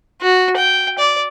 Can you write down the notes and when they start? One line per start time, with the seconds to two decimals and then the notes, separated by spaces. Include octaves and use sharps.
0.22 F#4
0.57 G5
0.99 D5